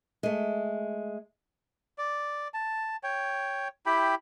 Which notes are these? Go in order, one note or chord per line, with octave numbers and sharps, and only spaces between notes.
G#3 A3
D5
A5
C#5 G5
E4 G4 G5 B5